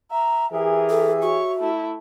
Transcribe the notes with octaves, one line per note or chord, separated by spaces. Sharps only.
E5 A#5
E3 G4 G#4 A#4 E5
A4
F#4 C#5 C#6
A3 E4